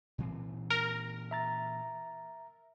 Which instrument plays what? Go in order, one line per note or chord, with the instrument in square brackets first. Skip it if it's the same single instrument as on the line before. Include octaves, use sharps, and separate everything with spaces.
[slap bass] A#2 E3 C4
[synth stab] A#4
[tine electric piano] E5 A#5 A6